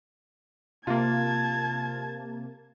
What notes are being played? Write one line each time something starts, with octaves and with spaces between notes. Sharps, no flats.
C3 A#3 F4 A5 G#6